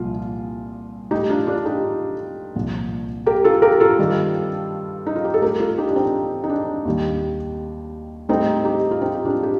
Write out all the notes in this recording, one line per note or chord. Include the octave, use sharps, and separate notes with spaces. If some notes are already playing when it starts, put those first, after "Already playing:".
Already playing: C2 A#2 F3 F4
A2 G3 D#4 G4
D4 F4
D4 F4
D#4 G4
C2 A#2 F3
G4 A#4
F4 A4
G4 A#4
F4 A4
G2 D#3 G3
D#4
F4
G4
A4
A2 G3 G4 A#4
F4 A4
D#4 G4
D4
C4 D#4
D#4
D4
D#2 D#3 G3
A2 G3 C4 D#4
D#4 G4
F4
C4 D#4
G4
D4 F4
G4